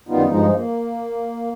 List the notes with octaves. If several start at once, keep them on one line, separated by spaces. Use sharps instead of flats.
F#2 D#3 G3 B3 D#4 F4
G2 F3 G#3 D#4
A#3